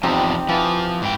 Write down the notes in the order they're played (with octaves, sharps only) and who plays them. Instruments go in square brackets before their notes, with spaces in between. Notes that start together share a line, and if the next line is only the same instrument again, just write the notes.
[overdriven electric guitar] E2 F3 [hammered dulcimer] C4 D#4 G4
[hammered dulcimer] E3 [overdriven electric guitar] F3
[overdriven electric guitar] G#2 G5